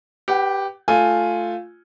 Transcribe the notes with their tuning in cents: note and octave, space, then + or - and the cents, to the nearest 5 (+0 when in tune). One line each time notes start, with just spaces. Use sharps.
G4 +0 B4 +0 F#5 +40
A3 +0 F4 +0 G#5 +0